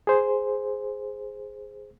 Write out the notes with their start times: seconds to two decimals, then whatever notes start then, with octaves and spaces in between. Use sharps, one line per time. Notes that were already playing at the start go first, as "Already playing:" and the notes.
0.07 G#4 C5